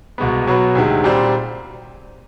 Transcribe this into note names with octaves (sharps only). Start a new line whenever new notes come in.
C2 B2 G#3 B3
B2 F#3 B3
D2 C3 D#3 G#3
A#2 G3 C4